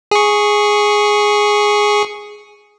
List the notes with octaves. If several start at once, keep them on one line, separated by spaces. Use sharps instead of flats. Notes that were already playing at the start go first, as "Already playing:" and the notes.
G#4 C#6